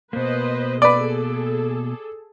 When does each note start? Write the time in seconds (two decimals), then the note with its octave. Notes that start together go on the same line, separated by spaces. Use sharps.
0.13 B2 A#3 B4 C5 D#5
0.82 G#4 A4 B4 D5